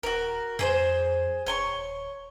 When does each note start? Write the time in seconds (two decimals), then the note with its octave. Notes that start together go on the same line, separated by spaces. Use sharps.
0.03 D#1 F#4 A#4
0.59 F2 G#4 B4 C5
1.46 D#1 C#5 C6 C#6